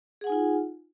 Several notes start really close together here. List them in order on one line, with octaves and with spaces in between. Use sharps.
G#4 F#5 G#5 D#4 F4